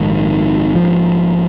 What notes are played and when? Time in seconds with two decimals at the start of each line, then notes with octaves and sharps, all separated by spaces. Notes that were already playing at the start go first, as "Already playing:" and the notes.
Already playing: A#1 G#2 D#3
0.75 F3